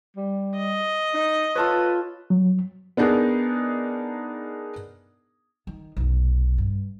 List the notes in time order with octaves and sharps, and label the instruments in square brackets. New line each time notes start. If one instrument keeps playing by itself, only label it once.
[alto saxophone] G3
[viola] D#5
[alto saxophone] D#4
[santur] F4 A4 C#5 [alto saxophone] B4
[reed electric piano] F#3
[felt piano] B3 D4 D#4 G#4 A#4
[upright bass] D#3
F1 B1
G2